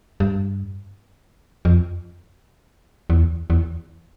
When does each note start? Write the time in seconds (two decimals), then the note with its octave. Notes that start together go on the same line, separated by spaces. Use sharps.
0.20 G2
1.65 F2
3.10 E2
3.50 E2